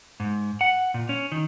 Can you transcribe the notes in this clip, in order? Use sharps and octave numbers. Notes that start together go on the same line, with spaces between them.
G#2
F#5
A#2
C#4
D#3